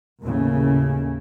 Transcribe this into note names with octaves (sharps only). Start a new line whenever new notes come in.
D#2 A2 C#3